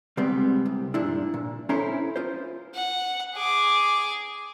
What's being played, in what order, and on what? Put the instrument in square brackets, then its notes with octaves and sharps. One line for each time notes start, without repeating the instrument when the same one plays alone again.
[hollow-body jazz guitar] C3 G3 G#3 B3 C4
C2
G2 A#2 F3 D4 E4
A#2
C#4 E4 A4 A#4 C5 C#5
F4 C5
[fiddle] F#5
G#4 D6